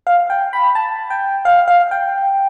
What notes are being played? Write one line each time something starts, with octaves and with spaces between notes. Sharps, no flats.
F5
G5
B5
A5
G5
F5
F5
G5